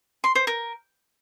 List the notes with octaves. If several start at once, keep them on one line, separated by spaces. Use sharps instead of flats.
C6
C5
A#4